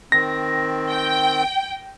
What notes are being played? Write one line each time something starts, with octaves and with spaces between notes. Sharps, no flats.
D#3 C4 A#6
G5